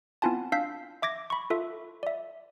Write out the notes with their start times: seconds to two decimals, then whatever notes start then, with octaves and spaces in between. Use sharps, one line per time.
0.22 B3 C4 E4 F4 G#5 A5
0.52 D4 F5 E6 G6 B6
1.02 E5 D6 G#6 A#6
1.30 B5 C#6
1.50 F4 A4 E5
2.03 D5 E5